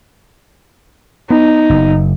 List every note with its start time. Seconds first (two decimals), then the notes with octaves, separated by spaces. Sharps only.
1.30 B3 D#4
1.70 F#1